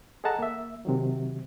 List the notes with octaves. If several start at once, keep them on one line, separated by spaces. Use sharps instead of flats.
G#4 A4 D#5 F#5 A5 A#5
A#3 E5
C3 D#3 F#3